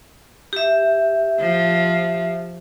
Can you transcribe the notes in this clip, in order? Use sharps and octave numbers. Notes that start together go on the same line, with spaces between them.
G4 E5
F3